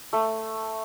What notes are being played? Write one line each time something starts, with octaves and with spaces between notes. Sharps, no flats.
A3